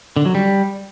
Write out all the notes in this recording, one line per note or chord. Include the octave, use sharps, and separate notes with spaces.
D3
F#3
G3